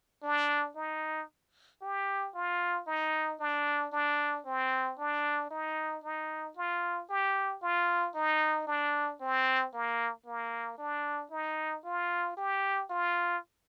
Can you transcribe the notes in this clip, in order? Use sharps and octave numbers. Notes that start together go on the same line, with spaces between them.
D4
D#4
G4
F4
D#4
D4
D4
C4
D4
D#4
D#4
F4
G4
F4
D#4
D4
C4
A#3
A#3
D4
D#4
F4
G4
F4